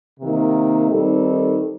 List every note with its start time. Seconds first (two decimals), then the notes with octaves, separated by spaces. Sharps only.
0.20 C3 D#3 A#3
0.91 D#3 G3 C4 D#4 A4